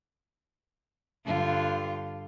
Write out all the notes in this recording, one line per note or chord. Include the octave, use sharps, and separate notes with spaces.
G2 D3 F4